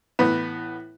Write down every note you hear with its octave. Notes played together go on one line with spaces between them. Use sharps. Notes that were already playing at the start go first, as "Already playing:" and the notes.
A2 E3 B3